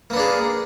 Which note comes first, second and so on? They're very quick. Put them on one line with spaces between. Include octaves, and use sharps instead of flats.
A#3 B3 D4 G#4